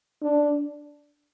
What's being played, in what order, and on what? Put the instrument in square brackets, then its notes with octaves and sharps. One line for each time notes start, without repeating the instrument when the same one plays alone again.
[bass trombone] D4